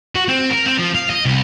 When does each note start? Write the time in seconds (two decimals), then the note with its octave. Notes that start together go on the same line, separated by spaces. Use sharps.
0.15 F#4
0.29 C4
0.50 A#4
0.66 C4
0.79 F3
0.95 F5
1.10 D#5
1.25 C2